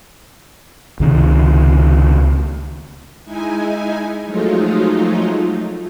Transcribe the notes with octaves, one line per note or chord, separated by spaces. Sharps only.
C#2 C3 D#3
G#3 D#4 E4 G#5
F3 F#3 G#3 A3 D#4 F4